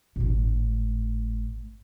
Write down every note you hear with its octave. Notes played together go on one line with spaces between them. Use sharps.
G#1 A2